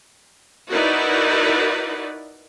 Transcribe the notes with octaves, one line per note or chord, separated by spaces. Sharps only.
D#4 E4 F#4 A#4 B4 D5